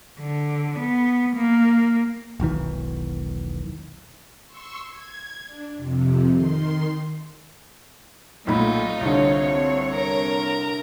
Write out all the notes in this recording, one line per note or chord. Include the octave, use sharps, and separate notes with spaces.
D3
B3
A#3
E1 B1 D#3 E3
C6 C#6 E6
G#6
D4
F2 C3
D#3 C6
B1 A#2 A3 D#4 F4 B5
C2 D3 C4 C#5
A#4 A#5